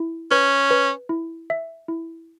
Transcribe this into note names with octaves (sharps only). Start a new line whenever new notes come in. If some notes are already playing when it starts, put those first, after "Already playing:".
Already playing: E4
C#4 B4
B4
E4
E5
E4